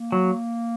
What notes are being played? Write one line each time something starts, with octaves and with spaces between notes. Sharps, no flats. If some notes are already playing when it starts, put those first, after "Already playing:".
Already playing: A#3
F#3